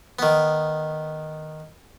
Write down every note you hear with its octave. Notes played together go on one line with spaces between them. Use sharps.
D#3 B3